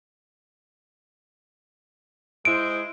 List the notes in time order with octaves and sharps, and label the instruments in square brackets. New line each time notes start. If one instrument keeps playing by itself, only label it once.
[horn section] G#3 E4 C5 [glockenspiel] D7